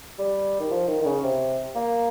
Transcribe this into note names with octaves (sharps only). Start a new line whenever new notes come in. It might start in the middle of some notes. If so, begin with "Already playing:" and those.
G3
D#3
F3
D#3
D#3
C#3
C3
A#3